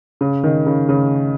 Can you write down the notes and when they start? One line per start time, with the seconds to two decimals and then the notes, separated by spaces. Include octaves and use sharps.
0.21 C#3
0.44 D#3
0.66 C#3
0.89 C#3